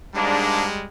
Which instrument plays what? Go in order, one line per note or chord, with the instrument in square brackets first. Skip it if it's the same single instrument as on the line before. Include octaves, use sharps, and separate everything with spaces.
[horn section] G#2 A#3 D4 [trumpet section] G3 G#3